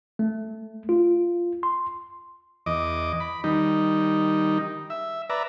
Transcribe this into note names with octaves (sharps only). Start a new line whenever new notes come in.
A3
F4
C6
E2 D#5 D6
B5
D#3 G3 D#4
E5
B4 D5 E5 A#5